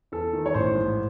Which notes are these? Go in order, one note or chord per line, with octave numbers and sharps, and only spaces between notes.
E2 A4
D#3
C#5
A1 C5
G#2